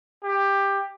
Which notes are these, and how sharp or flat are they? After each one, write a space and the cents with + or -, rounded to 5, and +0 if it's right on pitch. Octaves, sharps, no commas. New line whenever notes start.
G4 +15